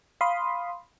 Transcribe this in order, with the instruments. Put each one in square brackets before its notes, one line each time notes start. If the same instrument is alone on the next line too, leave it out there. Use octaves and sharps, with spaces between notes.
[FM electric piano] F5 B5 C6 D#6